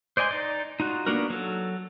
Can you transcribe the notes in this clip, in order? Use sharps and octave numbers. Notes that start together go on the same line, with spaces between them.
C5 D5 D#5 G#5 C6
D#4 D5
D#4 F4 F#4
A#3 B3 D4 F#4 A#4
F#3 A4